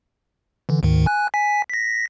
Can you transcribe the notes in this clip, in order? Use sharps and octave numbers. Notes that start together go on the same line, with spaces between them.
D3 E3
D2 G#2 D#3
G#5 F#6
G#5 B6
A#6 B6